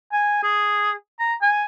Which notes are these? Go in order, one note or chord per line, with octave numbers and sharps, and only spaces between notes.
G#5
G#4
A#5
G#5